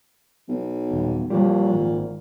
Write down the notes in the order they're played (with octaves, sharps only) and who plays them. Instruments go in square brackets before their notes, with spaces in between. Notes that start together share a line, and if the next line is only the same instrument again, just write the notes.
[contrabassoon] B1
[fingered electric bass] D#1
[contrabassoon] A#2 [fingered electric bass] F3 G3
[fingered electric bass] G#1